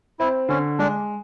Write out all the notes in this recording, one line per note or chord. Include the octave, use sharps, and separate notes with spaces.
C4 E4
D3 C#4
G#3 D4